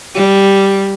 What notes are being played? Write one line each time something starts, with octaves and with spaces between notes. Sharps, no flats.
G3